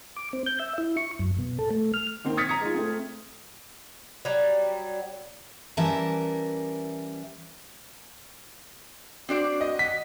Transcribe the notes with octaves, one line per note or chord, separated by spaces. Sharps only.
D6
C4
G6
E5
E4
C#6
F#2
B2
A4
A3
F6
D#3 A#3 C4
D#6 F6 G#6 A6 B6 C#7
A#5 D#6 G#6 C#7
G#3 D#4 F4
A3 C4
F#3 G3
E3 G3 C#4 A#4 E5 A5
C4 D4 F#4 D5
D#5
F#5 B6